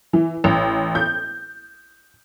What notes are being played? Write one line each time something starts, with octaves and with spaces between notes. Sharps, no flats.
E3
A1
G6